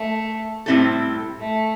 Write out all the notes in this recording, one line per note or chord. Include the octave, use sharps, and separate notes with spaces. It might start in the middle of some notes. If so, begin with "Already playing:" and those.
Already playing: A3
A2 G3 C4 E4 A4
A3